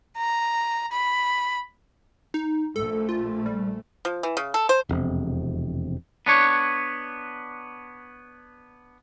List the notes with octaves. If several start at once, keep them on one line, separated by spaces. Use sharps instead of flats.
A#5
B5
D#4
A#1 A3 A4
F4
G3
F3
E3
C#3
A4
C5
E1 F2 C3
B3 D4 C#5